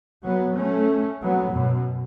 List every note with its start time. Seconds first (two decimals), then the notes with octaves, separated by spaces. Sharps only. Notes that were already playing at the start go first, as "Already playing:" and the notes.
0.24 F#3 B3
0.57 A3 C#4
1.21 F#3 B3
1.53 F#2 B2